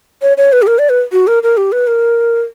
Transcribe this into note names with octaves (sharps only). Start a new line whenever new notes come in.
C#5
C#5
B4
G4
A#4
D5
B4
F#4
A#4
A#4
G4
B4
A#4